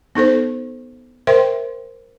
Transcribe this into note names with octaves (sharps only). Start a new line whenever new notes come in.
B3 D#4 A4 C5
A#4 C5 E5 G5 C6